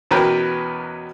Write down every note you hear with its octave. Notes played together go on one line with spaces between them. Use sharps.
E2 B2 C#4 A#4 B4 G5